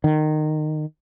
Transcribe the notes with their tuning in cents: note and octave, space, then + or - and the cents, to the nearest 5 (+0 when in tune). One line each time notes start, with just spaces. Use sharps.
D#3 -20